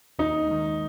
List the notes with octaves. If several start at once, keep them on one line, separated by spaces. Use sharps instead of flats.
D#2 D#4
D#3 G#3